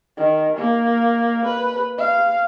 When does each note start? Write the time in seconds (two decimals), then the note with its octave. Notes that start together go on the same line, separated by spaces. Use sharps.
0.17 D#3
0.56 A#3
1.45 B4
1.98 F5